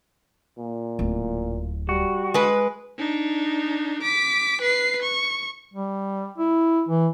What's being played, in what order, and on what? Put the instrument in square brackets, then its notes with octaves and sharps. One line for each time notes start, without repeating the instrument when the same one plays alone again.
[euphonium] A#2
[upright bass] D1 D2
[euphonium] G3 [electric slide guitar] F#4
[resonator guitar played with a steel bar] G#3 B4
[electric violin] D4 D#4
D6 B6
B4 C7
C#6
[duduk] G3
E4
E3